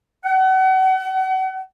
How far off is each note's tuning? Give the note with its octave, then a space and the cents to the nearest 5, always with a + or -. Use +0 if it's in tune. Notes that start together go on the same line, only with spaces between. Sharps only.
F#5 +35